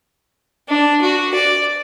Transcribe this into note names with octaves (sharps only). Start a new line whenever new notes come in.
D4
F#4
D5